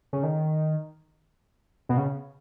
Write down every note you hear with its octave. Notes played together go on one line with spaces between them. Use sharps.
C#3
D#3
B2
C#3